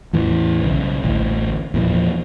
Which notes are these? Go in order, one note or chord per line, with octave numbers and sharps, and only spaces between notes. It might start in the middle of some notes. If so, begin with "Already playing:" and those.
E2 A2 E3
B1 C#3
A1 D2
E2 A#2 F3